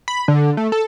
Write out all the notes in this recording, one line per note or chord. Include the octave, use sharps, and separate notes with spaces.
B5
D3
A3
A4